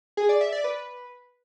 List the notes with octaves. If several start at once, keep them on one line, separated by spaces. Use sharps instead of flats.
G#4
D5
E5
D5
B4